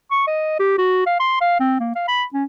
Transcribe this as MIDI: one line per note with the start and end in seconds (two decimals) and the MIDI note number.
0.11 0.25 85
0.27 0.57 75
0.59 0.74 67
0.78 1.02 66
1.06 1.15 77
1.20 1.36 84
1.41 1.58 77
1.60 1.78 60
1.80 1.93 58
1.95 2.07 77
2.08 2.24 83
2.33 2.44 61